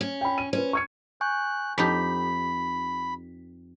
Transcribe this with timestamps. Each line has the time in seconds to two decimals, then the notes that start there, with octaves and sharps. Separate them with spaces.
0.01 C#4
0.21 G5 B5
0.38 D#7
0.53 C#4 B4 C5
0.73 C#6 G#6 C#7
1.21 G#5 C#6 F#6 G6
1.78 F2 D#4 G4 B5 B6